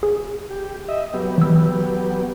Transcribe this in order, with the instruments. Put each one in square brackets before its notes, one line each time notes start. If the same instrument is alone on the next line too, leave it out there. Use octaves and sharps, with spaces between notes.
[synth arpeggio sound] G#4
[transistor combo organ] G4
D#5 E5
F#3 B3 G4
[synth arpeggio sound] E3 E6